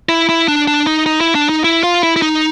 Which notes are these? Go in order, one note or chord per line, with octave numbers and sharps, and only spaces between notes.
E4
E4
D4
D4
D#4
D#4
E4
D4
D#4
E4
F4
E4
E4
D#4